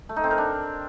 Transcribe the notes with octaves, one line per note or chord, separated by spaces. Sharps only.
A3
D#4
C4
A#4
D4